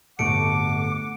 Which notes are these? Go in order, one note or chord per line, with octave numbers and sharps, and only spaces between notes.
D1 G1 A3 F#5 C#6 D6 C#7 D7